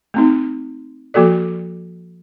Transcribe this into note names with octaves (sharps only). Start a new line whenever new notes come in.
A3 C4 D#4
F3 A#3 F#4 A4 D5